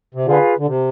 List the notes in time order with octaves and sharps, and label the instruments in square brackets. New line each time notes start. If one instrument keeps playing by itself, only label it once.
[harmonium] C3
[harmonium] D3 [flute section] F4 G#4 B4 F5
[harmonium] D3
C3